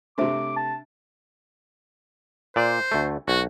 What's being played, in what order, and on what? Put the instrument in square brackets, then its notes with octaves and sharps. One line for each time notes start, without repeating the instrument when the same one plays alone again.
[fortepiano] C3 A3 [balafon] D4 C5 E5 [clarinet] D6
[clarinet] A5
[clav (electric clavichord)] A#2 D5 [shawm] C5
[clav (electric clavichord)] D2 A3
[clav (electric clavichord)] B1 [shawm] F#4